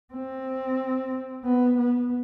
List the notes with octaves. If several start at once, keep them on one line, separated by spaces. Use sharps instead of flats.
C4
B3
B3